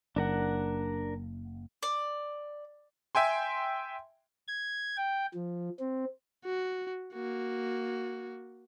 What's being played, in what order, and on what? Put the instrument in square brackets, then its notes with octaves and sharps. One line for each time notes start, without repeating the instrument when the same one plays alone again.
[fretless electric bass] F#1 [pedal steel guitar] D4 A#4 F#5
[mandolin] D5
[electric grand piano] E5 G5 G#5 C6
[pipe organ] G#6
G5
F3
C4
[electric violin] F#4
A#3 F#4